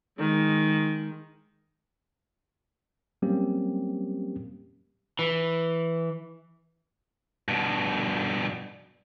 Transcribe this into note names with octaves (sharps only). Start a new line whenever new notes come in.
D#3 G#3
F#3 G3 A#3 C4 C#4 G4
E3
G2 B2